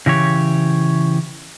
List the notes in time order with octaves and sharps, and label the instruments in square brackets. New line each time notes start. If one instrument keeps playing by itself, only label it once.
[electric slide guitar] C#3 E3 G4 C#5